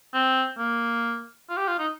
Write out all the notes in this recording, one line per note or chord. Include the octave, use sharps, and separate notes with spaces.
C4
A#3
F4
G4
F4
D#4